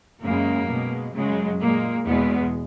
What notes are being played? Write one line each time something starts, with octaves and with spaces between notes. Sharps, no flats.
F#2 C#3 G#3 A#3
B2 G#3
F#2 C#3 F#3 G#3
A#2 G#3 A#3
E2 B2 G#3 B3